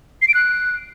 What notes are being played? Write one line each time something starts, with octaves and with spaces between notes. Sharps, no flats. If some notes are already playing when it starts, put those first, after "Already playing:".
C7
D7
F#6